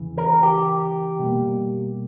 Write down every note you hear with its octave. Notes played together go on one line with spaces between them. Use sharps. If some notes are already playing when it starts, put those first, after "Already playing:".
Already playing: E2 C#3 E3
A#4
G4
B2 G3 A#3